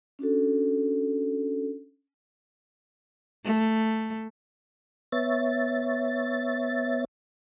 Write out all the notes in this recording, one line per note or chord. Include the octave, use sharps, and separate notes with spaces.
C#4 D4 F#4 A4
A3
B3 C#5 E5 A6